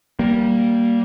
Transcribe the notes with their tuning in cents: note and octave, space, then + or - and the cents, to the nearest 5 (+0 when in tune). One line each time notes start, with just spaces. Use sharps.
G3 -15 A#3 +0